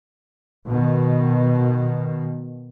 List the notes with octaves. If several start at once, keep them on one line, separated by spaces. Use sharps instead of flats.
B2 D#3